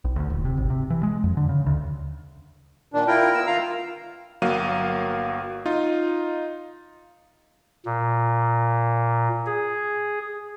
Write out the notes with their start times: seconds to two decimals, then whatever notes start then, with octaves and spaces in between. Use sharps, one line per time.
0.04 B1
0.16 D2
0.30 D#1
0.45 C3
0.58 G#1
0.70 C3
0.90 E3
1.03 G#3
1.24 F2
1.37 D3
1.49 C#3
1.66 D2
2.94 A#2 D#3 D4
3.07 E4 F4 A#4 G5
3.34 B3 E6
3.47 D#3 F4 F5 A#5
4.42 G1 F#3 A#3 F5 D#7
5.66 D#4 F4
7.86 A#2
9.46 G#4